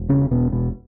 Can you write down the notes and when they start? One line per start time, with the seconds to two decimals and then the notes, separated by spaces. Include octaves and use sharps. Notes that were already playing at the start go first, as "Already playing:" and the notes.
Already playing: E1
0.09 C#3 C#4
0.31 E1 B2 B3
0.52 B2 B3